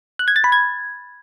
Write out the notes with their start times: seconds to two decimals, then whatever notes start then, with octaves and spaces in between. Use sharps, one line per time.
0.19 F#6
0.28 G#6
0.36 A6
0.44 B5
0.52 G#6